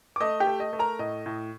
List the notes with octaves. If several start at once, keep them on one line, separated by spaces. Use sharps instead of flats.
D6
A3 D#5 D#6
G4 G5
A3
D#5
A3
A#4 A#5
A2 D#5
A2